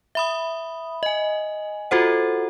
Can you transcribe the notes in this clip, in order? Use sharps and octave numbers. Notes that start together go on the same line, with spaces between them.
E5 B5 D#6
D#5 G#5
F4 F#4 A4 C5 F#5